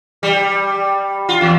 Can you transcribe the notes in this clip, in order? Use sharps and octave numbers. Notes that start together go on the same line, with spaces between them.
G3
F4
E2